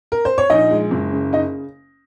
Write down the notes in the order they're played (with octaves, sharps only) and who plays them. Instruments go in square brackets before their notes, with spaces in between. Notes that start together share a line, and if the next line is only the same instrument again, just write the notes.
[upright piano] A#4
C5
C#5
A#1 D#4 D#5
G#3
F#1
C#3
D#4 D#5